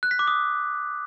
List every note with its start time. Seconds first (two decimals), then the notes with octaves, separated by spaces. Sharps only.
0.03 F#6
0.11 B6
0.19 D6
0.27 D#6